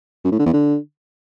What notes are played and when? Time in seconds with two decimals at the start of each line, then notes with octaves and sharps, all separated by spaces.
0.25 F#2
0.32 A2
0.39 D3
0.46 E2
0.53 D3